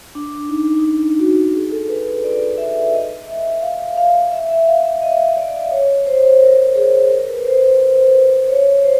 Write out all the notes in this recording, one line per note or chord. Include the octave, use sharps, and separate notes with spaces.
D4
D#4
D#4
D4
F#4
G#4
A4
B4
D5
E5
D#5
E5
F5
F5
E5
E5
F5
E5
D#5
D5
C#5
C5
A#4
G#4
A#4
B4
C5
C5
C#5
C5